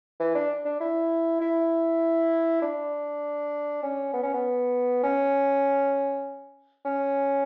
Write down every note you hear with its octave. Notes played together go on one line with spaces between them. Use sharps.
E3
D4
D4
E4
E4
D4
C#4
B3
C#4
B3
C#4
C#4